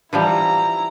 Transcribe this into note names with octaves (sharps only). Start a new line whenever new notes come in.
E3 F3 G3 E4 A#5